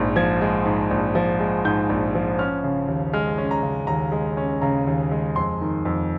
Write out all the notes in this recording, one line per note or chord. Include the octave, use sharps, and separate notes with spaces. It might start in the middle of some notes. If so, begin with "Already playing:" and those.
Already playing: A#1 G#2 G#3
F3 G#6
G#3
G#2
A#1
F3
G#3
G#2 G6
A#1
F3
C#4 F6
C#3
D#2
G#3 F6
C#4
A#5
C#3
D#2 A#5
G#3
C#4
C#3 A#5
D#2
G#3
F2 C6
D#3
F2